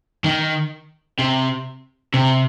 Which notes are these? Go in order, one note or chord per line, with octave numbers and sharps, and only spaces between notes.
D#3
C3
C3